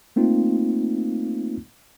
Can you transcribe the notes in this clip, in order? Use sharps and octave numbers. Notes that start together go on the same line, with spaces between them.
A3 A#3 C4 D#4 F4